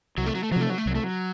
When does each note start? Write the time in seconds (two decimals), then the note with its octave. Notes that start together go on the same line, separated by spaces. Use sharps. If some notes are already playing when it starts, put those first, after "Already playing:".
0.17 C2 F#3
0.26 A3
0.35 F#3
0.43 A3
0.51 F3 F#3
0.56 C3 A3
0.70 F#3
0.78 A3
0.86 C2 F#3
0.95 A3
1.04 F#3